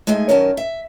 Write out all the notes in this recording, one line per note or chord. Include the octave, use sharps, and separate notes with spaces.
G#3 A3 D#4 G#4 G#5
F#2 D#3 C#4 A#4 G#5 A5
E5